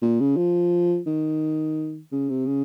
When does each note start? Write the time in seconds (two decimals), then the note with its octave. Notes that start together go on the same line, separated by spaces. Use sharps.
0.02 A#2
0.20 C#3
0.37 F3
1.06 D#3
2.12 C#3
2.29 C3
2.46 C#3